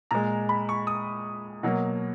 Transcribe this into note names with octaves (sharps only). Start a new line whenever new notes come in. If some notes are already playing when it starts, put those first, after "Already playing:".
A#2 G#3 A#5
B5
C#6
D#6
B2 F#3 A#3